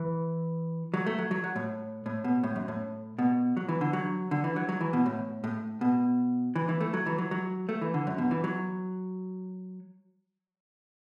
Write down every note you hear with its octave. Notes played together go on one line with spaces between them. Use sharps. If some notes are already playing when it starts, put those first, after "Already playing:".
Already playing: E3
F#3
A3
F#3
F#3
F#3
A2
A2
B2
A2
F#2
A2
B2
F#3
E3
D3
F#3
D3
E3
F#3
F#3
E3
B2
A2
A2
B2
E3
E3
A3
F#3
E3
F#3
F#3
A3
E3
D3
F#2
B2
E3
F#3